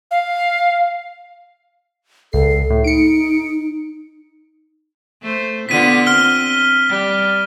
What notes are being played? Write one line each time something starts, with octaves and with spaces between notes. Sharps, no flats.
F5
C#2 A4 C7
A2
D#4 C#7 D7
A3 C5
D3 B3 F4 B6 D#7
C4 F6 G7
G3